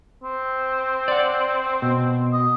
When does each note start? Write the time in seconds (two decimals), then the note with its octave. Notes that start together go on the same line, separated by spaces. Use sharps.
0.23 C4
1.08 D5 F#5
1.82 B2
2.33 D#5